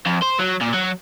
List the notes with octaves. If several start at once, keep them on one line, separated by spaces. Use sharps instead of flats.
F2
C5
F#3
A#2
F#3